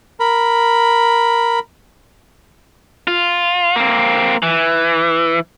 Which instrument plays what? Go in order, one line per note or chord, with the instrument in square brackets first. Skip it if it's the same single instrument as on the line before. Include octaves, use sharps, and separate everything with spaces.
[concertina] A#4 B5
[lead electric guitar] F4
A#3 C4
E3